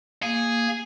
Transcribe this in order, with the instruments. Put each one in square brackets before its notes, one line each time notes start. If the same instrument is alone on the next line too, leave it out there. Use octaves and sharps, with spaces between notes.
[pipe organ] A#3 [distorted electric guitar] G#4